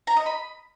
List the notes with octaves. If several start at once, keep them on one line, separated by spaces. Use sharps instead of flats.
A#5
D#5
B5